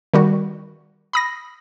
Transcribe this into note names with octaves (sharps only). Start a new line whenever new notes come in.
D#3 G3 F#4
B5 D#6 A#6